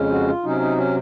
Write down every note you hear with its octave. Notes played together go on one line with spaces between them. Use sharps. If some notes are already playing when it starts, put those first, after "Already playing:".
Already playing: F2 C#3 G#3 C#4
F#4
F4
C3 F#3 C#4 D#4
D#4
C#4